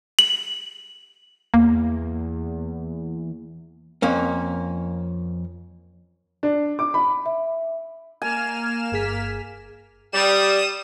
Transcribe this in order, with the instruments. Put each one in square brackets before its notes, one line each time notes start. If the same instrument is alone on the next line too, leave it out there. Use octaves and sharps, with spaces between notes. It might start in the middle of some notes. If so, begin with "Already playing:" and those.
[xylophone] F#7
[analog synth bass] E2 [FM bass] A#3
[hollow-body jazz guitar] F2 A#3 C#4
[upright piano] D4
D6
B5
[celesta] E5
[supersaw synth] A#3 F6 E7 [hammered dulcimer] G#5
[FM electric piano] G1 G#4 B6
[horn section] G3 [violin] D#6 E7